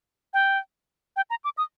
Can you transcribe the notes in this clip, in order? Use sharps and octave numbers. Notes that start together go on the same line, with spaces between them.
G5
G5
A#5
D6
D#6